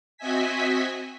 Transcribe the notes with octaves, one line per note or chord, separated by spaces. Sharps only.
C4 F#4 D#5 E5 G#5 B6